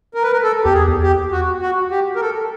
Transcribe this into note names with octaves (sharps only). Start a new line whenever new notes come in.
A#4
B4
A#4
A4
E2 G4
G#4
E2
G4
F#4
F#4
G4
A#4
A4